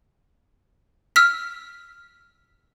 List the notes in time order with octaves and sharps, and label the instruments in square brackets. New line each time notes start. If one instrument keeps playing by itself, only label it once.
[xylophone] E6 F6 B6